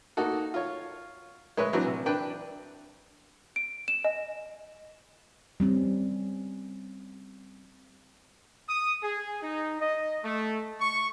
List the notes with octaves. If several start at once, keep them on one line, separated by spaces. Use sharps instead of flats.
A#3 D#4 F#4 A4
F4 C#5
G#3 B4 C#5 E5
E3 F#3 C4 D4
C3
D4 B4 G5
D7
E7
D#5
G3 C4 C#4
D#6
G#4
D#4
D#5
A3
C#6